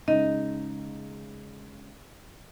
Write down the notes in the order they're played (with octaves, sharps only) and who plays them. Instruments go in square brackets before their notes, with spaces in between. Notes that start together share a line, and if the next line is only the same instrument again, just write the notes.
[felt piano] C#3 G#3 [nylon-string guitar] D#4 [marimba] D#5